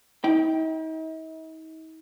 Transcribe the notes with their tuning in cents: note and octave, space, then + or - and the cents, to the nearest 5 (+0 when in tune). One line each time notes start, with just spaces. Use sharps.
D#4 +45 G5 +0